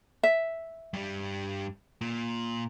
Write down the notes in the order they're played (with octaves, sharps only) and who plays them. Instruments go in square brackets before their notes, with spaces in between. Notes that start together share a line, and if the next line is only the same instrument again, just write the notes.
[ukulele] E5
[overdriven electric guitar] G2 G3
A#2